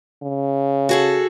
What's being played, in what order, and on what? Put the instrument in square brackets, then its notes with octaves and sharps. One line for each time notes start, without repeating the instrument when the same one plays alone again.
[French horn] C#3
[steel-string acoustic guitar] F#4 G#4 A4